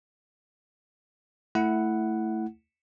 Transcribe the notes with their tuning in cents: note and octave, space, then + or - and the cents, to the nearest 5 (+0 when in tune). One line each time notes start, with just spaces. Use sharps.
A3 +5 E4 +0 F#5 +0